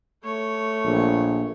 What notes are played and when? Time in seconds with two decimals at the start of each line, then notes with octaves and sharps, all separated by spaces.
0.24 A3 C#5
0.85 A#1